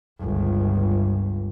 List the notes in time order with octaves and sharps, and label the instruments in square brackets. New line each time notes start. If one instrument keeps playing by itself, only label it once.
[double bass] G1 C#2